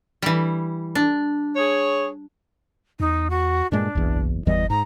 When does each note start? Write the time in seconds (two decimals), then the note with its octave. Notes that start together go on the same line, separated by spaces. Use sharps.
0.22 E3 G3
0.95 D4
1.56 G#4 C#5
3.00 E2 D#4
3.30 F#4
3.72 G2 A#2 G#3 D4
3.95 F#1 B1 E2
4.47 G1 E2 E3 G3 D#5
4.70 G#2 A#5